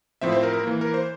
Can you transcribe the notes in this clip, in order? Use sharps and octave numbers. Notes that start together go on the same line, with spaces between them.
A2 F3 C4 E5
C5
A#4
A#4
E3 A#3
A#4
C5